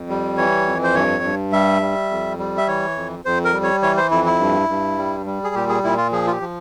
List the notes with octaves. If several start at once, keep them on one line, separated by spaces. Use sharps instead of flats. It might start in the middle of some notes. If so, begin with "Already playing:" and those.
Already playing: F2
G3
E3 C#5
F2
C5
G2 C#5
G2
G3 E5
G3
F2
G3
E5
E3 C#5
F2
F2 C5
A#4
G3
C#5
E3 C#5
C5
F2 E4
E4
G2
G2
G3
G3
G#4
A#2 G4
G#4
A#2 E4
F4
F3 G#4
F4
G4
F3